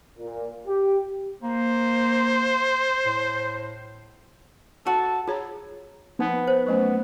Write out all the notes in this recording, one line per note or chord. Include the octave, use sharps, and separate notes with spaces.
A#2
G4
A#3 C5
A2
F#4 A4 A5
F4 G#4 C#5 A#5
F3 B3 D#4
C5
F#3 A3 C#4